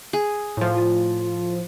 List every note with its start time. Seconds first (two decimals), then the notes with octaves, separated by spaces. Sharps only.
0.13 G#4
0.57 A2 F3
0.74 F4